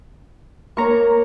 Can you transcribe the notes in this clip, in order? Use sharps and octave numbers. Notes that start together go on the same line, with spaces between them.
A#3 C#5 A#5 C#6